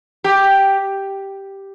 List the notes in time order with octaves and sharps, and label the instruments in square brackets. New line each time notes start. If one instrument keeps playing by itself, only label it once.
[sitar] G4